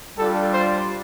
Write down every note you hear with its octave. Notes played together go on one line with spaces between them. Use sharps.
G3 D4 F4 A4
C5